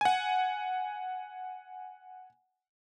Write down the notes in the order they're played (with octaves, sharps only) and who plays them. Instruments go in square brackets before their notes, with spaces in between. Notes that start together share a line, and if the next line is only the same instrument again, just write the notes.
[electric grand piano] F#5 G#5